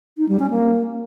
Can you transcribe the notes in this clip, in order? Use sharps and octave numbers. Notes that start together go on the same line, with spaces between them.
D#4
G3
C#4
A#3